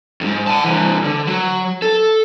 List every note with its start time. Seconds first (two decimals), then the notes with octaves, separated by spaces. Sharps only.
0.21 F2 G#2
0.47 F#5 A5
0.64 C3 E3
1.04 D3
1.27 F#3
1.82 A4